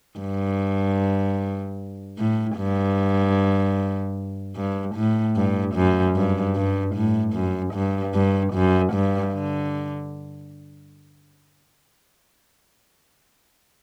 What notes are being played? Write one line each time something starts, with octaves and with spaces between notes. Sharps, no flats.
G2
A2
G2
G2
A2
G2
F#2
G2
G2
A2
F#2
G2
G2
F#2
G2
D3